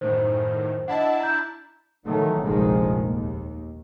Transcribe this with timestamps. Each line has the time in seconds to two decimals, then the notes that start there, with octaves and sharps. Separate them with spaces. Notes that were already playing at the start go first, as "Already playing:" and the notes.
0.01 F#2 A2 D#3 C5
0.88 D4 E4 D#5 F#5 A5
1.20 A#5 G6
2.04 D#3 E3 F#3 A3
2.43 F1 A#1 D#3 F3 G#3
3.01 D#2